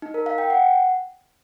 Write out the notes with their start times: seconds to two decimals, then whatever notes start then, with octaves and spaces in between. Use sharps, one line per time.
0.02 D#4
0.14 A#4
0.26 F5
0.38 G5
0.50 F#5